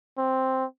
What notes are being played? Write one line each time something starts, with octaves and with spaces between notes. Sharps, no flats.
C4